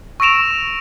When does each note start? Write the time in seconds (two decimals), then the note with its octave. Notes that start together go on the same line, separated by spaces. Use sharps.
0.20 C#6 E6 A#6 D7 E7 F7